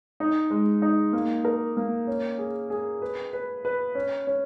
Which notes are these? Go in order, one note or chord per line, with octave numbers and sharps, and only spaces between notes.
D#4
G#3
D#4
A#3
A#4
A#3
C#4
G#4
G#4
B4
B4
B4
C#4
C#4